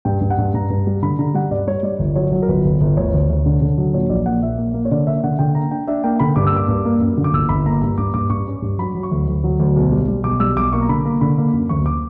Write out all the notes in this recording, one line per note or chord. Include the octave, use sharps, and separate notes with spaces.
G2 G5
G2
F#5
G2
G2 A#5
G2
G3
D3 B5
D3 A#5
G3 F#5
G2 D5
G3 C#5
G3 D5
G1
F#3 C#5
F#3
A#4
G1 B4
G1
G1
D2 C#5
D2
D2
D3
D3
F#3
A#2 C#5
A#1 D5
A#3 F#5
A#1 E5
A#3
A#3
C#5
D3 D5
A#3 E5
D3 F#5
D3 G5
A#3 A#5
D4 G5
D4 E5
A#3 G5
D3 B5
G2 D6
E6
A#3 D6
G2
A#3
F#2
D3
D6
G1 E6
G1 B5
A#3 A#5
G2 A#5
G2 D6
G2 D6
G2 C#6
C#4
G2
F#3 B5
F#3
C#6
D2
D2
F#3
D2
B1
G3
G3
B1 D6
G3 E6
B1 D6
A#3 C#6
A#5
D3 B5
A#3 A#5
D3 B5
A#3
F#2
D2 C#6
D6